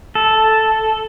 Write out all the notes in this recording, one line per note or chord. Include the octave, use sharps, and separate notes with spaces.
A4